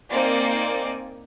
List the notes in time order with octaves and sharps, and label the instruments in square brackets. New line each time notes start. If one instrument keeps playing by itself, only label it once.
[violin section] A#3 C4 D#4 C5 D5 G#5